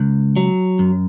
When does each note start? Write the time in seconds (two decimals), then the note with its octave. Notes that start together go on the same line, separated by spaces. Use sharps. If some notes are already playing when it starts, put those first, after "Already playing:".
Already playing: C#2
0.36 F#3
0.79 F#2